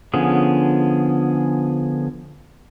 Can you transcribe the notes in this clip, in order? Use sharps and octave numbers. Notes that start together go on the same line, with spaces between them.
D3 F3 B3 C#4 G#4